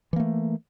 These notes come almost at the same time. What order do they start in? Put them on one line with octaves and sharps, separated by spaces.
E3 A#3 A3